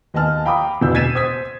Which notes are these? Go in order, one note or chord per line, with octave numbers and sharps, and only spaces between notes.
D#2 D#5 G#5 A5 F6
F5 G5 A#5 B5 D6 D#6
E1 D2 B2 E6 G6
G#6 A6 B6 C7 D#7 E7
C5 D#6 G#6 B6